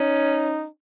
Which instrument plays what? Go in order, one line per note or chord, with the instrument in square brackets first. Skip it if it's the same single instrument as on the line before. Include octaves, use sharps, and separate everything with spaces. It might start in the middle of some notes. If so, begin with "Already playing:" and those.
Already playing: [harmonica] C#4 [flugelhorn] D#4